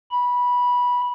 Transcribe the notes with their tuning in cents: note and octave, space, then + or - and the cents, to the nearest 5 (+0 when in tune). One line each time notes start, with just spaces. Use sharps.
B5 -15